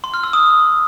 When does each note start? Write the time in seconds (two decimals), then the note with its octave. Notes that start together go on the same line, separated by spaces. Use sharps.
0.04 C6
0.14 F6
0.23 E6
0.33 D#6